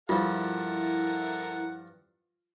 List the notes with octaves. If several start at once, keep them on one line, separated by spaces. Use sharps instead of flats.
G2 F3 E4 F4 A4 A#4 F#5